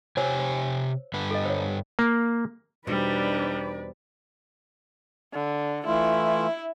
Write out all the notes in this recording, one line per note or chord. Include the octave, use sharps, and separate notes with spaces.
C3 G4 C5 C#5 G#5 E6
C5
G2 D3 B4
A4 D#5
C5 C#5
A#3
E2 B2 G3 C4 D4 D#4 B4 D5
D3
E3 A3 E4 F4